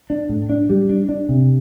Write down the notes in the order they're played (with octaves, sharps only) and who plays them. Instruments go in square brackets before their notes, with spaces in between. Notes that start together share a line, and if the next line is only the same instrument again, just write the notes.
[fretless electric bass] D4
A2
D4
G3
D4
D4
C3